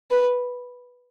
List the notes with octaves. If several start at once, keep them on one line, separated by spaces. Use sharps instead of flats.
B4